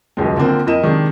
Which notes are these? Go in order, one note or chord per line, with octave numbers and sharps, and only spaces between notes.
D#1 C#2 F#2 G#3
D3 F3 A#3 C4
F2 E4 A#4 D#5 E7
C3 D#3 G#3 D4